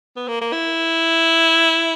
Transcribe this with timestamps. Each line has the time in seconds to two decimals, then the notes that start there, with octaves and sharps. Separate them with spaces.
0.17 B3
0.28 A#3
0.41 A#3
0.53 E4